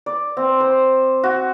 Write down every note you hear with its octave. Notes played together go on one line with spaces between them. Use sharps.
D5
C4
C5
F#4